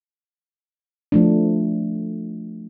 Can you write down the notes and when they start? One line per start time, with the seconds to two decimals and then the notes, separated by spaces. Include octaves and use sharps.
1.12 F3 A3 D4